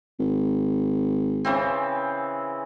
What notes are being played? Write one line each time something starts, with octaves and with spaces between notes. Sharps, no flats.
G#1
C#3 E3 C4